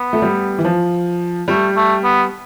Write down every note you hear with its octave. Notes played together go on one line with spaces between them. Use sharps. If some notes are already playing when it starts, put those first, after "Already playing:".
Already playing: B3
A3
G3
E3
F3
G3 A3
A3
B3